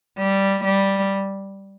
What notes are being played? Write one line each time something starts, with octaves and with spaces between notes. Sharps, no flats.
G3
G3